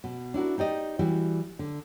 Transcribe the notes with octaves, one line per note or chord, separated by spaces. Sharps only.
B2
D4 E4 F#4 A#4
D#4 G4 D5 D#5
E3 G3 E4 F#4
D3